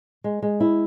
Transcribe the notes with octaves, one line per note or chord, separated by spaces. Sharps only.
G#3
G#3
E4